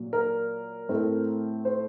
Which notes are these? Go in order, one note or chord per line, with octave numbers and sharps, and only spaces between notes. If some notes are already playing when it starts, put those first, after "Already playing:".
Already playing: A#2 F#3
A#4
A2 A3 C4
C5